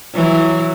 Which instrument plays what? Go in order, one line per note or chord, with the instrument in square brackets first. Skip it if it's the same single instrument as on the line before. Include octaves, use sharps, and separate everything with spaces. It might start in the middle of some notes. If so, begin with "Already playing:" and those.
[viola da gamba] E3 F#3